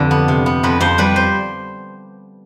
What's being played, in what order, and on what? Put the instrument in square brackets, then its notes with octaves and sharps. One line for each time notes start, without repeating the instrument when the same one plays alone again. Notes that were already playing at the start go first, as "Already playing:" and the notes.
Already playing: [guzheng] F2 D3 G4 B4
B3
C3
B3
F2 B4
F2 C5
G3 B4
C5